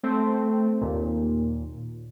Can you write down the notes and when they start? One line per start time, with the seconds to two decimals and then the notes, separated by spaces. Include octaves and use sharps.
0.03 A3 C4
0.81 D#2 A#2